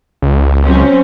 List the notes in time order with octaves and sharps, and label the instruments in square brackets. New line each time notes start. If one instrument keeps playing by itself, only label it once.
[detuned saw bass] C#2
[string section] F#3 C4 C#4